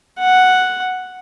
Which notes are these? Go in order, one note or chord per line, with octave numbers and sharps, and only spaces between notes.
F#5